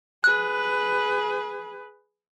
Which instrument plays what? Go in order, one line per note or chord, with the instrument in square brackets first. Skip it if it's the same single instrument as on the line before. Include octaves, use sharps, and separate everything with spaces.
[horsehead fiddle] G#4 B4 [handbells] F#6